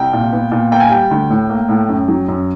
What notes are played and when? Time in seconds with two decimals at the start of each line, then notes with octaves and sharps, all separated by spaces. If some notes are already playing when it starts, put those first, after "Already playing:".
Already playing: C2 G5
0.13 A#2
0.33 B3
0.51 A#2
0.71 A#3 G5
0.80 G#5
0.89 G3 G5
1.11 D2
1.30 A2
1.49 A#3
1.68 A2
1.89 F#2
2.08 F#3
2.28 F#2